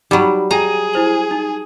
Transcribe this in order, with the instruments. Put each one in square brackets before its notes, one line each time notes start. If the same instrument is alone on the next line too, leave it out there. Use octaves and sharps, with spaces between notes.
[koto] F#3 G3 [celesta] D#4 B5
[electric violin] G#4 [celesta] G5 D#7 [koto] A#5
[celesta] E4 C5 F#7
D#4